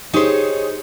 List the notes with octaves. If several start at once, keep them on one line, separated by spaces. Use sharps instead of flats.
D#4 G4 G#4 C5 C#5